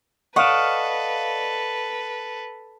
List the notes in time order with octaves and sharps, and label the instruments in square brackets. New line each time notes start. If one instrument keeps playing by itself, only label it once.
[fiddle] A4 B4 [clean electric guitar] D5 F5 [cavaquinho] D#5 F#5 [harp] C#6 E7